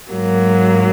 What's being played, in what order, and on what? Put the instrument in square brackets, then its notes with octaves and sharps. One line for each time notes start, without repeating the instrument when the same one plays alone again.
[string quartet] G#2 F#3 A#3